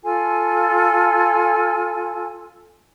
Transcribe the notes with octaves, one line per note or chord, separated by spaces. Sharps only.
F4 A4 G#5